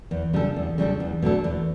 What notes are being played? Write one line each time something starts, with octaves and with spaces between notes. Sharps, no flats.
E2
C#3 G3 D4 A4
E2
C#3 G3 D4 A4
E2
B2 A3 D4 A4
E2